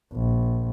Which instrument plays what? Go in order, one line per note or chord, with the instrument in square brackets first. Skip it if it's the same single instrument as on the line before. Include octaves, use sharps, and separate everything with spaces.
[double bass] A#1